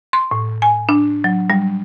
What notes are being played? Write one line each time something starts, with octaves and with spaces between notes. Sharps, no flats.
C6
A2
G#5
D4
F#3
G3